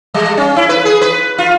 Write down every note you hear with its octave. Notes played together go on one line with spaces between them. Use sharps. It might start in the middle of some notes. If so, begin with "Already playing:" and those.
G3
C#4
E4
B4
G#4
B4
F4